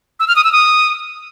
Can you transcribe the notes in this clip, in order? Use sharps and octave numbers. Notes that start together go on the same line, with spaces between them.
E6
F6
D#6
E6
D#6